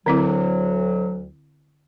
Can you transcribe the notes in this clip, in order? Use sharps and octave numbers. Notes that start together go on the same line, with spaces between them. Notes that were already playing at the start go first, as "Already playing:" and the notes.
D2 D3 F#3 C4 E4